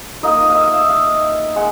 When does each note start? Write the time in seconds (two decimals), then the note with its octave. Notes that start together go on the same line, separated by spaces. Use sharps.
0.23 A#3 D#4 D#5
0.50 F5
0.56 E5
0.89 F5
1.56 G#3 F#5